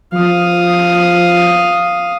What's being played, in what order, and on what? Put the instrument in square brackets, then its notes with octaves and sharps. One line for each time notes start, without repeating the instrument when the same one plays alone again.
[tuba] F3 [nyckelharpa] F5 D#6